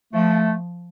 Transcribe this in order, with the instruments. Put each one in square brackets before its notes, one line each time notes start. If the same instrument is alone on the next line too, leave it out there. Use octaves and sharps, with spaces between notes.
[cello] F3 [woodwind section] A3